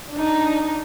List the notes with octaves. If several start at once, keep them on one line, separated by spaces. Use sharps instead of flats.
D4 D#4